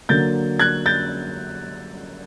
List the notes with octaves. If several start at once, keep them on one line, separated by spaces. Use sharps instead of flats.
D3 F#3 A#3 G6 A6
F#6 G#6
G6 A6